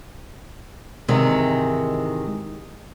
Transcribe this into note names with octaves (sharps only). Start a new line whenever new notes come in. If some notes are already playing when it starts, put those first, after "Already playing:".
G#2 C3 D#3 E3 G#3